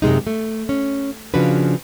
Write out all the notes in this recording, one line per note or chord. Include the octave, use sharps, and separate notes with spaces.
F#2 C3 G#3 D#4
A3
C#4
C#3 F3 D4 F#4 B4